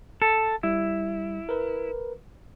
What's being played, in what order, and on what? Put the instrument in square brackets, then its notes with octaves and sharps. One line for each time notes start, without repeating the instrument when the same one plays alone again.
[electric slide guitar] A4
[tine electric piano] G3 [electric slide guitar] E4
[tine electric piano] A#4 B4